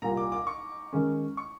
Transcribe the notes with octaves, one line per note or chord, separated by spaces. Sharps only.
C2 A#2 G3 A#5
D6
D6
C#6
D#3 G#3 C#4
C#6